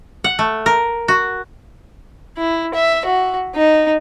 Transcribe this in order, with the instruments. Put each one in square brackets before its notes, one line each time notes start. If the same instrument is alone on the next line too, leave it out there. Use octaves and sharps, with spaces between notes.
[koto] F#5
A3
A#4
F#4
[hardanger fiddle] E4
E5
F#4
D#4